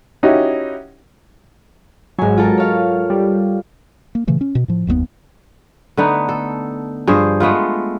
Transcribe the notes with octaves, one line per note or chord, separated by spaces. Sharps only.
C#4 D#4 E4 F#4 G4
G#1 F#3 G#3 G#5
F4 A4 A#4
C#5 F5
G3
A#3
A#2 C#3 E3 A3
C#4
B2
A2 F3
F#1 D#2 C3 B3
D3 A3 B3 D#4
A4
G2 F3 G#4 C5
G#3 A3 B3 F4